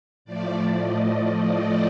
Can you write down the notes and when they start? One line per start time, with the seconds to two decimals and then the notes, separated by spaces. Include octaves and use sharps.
0.25 A2 F3 A3 D5
0.79 D#5
1.35 D#5